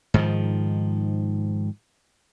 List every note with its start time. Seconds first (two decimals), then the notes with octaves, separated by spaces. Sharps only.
0.14 G#2 D#3 F3